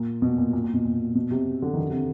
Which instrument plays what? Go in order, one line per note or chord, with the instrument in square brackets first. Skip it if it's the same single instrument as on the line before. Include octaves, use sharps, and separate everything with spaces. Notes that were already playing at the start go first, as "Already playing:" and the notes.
Already playing: [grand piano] A#2
B2
A#2
A#2
A#2
B2
A#2
B2
C3
D3
D#3
D3
C3